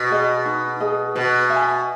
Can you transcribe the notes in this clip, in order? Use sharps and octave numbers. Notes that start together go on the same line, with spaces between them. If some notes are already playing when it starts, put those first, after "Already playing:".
Already playing: B2
G#4 D#5
D#4
G#4 D#5
B2 B4
E5
G#5